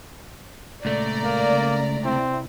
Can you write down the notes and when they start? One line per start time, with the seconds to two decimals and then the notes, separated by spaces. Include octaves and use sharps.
0.85 C#2 A#2 A3 D5 A#5
1.24 A#3
1.52 C#3
2.04 C3 C4 E4